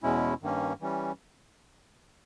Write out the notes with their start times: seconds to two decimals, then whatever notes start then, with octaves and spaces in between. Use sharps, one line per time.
0.03 E2 B2 G#3 C#4 E4
0.42 G2 D#3 A#3 C#4
0.80 E3 G3 C#4